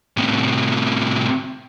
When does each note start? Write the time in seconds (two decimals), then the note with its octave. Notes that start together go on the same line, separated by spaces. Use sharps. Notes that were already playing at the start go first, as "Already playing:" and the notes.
0.17 A2 C3